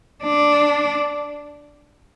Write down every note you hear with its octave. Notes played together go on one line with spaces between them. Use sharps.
D4